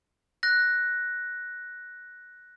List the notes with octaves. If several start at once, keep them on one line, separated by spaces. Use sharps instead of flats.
F#6 A#6